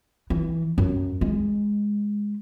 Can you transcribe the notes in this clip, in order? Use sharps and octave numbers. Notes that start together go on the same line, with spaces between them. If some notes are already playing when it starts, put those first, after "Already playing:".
E3
F#2
G#3